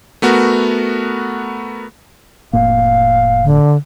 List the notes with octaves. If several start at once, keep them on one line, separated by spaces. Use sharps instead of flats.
A3 B3 F#4 A#4
F1 A2 A#3 F5
D3